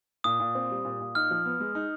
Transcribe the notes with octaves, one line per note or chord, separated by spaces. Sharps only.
A#2 D#6
A#2
C4
G3
A#2
A#2
D#4 F6
F3
B3
G#3
D#4